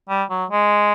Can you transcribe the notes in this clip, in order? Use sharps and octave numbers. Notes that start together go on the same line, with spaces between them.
G3
F#3
G#3